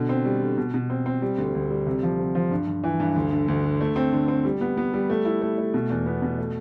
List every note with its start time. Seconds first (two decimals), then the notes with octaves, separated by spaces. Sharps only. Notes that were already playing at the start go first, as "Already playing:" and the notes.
Already playing: B2 D3
0.09 C4
0.25 G3
0.41 D3
0.58 B2
0.74 B2
0.90 C4
1.06 C4
1.22 G3
1.38 D2
1.54 D2
1.70 G3
1.87 C3
2.03 F3
2.19 C3
2.35 F3
2.51 G2
2.67 G2
2.84 E3
3.00 G2
3.16 D2
3.32 D3
3.48 D2
3.64 D3
3.81 A3
3.96 C4
4.13 D3
4.28 C4
4.45 G3
4.61 B3
4.77 B3
4.93 G3
5.10 A3
5.25 E4
5.42 A3
5.58 A3
5.74 B2
5.90 E2
6.06 B3
6.22 B2
6.38 A3